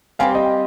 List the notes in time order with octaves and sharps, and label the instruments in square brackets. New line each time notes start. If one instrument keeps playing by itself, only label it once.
[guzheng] G3 C4 G4 [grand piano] F5 G#5
[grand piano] D#5 G5